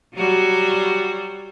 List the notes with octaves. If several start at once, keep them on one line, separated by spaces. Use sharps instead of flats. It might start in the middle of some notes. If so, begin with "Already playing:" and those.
F#3 G3 F#4